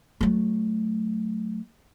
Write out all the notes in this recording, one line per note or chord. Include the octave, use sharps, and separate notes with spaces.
F#3 A3